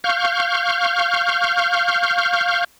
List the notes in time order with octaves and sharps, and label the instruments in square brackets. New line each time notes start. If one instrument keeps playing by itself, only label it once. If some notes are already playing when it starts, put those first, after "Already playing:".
[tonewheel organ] F5 C#6 F6 G6